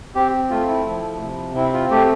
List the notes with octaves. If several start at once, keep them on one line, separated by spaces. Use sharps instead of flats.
C4 G4
A3 F4
E4
F3
C3
C4 E4
F4
A3 G4